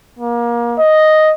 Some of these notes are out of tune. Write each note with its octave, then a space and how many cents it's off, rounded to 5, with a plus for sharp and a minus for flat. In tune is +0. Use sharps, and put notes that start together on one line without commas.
A#3 +30
D#5 +0